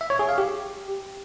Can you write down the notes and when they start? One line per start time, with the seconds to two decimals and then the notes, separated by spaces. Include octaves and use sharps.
0.01 E5
0.10 C#5
0.19 G#4
0.29 F5
0.38 G4